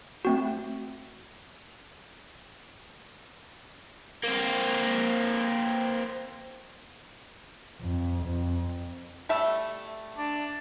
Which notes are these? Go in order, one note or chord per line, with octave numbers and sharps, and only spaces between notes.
A3 C4 F#4
A#3 C4
F2
F2
G3 A3 E5
D4